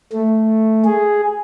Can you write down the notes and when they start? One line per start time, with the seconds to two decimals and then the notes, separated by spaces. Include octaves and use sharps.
0.13 A3
0.85 G#4